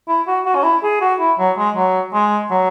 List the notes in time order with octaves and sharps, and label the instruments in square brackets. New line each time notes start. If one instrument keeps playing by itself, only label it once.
[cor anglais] E4
F#4
F#4
C#4
E4
G#4
F#4
E4
F#3
G#3
F#3
G#3
F#3